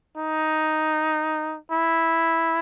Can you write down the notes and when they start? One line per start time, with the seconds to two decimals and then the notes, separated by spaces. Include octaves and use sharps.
0.18 D#4
1.72 E4